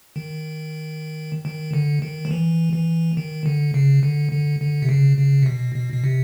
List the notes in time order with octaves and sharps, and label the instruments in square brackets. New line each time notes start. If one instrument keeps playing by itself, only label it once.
[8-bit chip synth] D#3
D#3
D3
D#3
F3
E3
E3
D#3
D3
C#3
D3
D3
D3
C3
C#3
C#3
C3
B2
B2
B2
C3